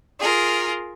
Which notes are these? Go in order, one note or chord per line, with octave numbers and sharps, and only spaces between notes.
F4 G#4 A#4